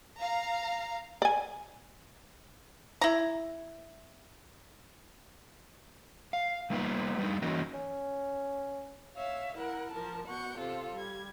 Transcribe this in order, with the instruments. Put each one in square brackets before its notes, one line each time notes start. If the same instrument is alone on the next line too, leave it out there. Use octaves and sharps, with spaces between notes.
[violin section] F5 A#5
[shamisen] D5 G#5
[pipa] E4 A#5
[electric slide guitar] F5
G3 A#3 B3 D#4 F4 B4
G3 D4 D#4
E3 A#3 C#4 D#4 F#4 A#4
[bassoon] C#4
[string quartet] C#5 E5 F5
E4 A#4 F#5
F3 A#4 A5
B2 F#5 C#6 G6
C3 F4 A4 C5
G3 G#6